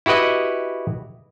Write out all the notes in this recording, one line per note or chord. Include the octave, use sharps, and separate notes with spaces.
E4 F#4 G4 B4 D#5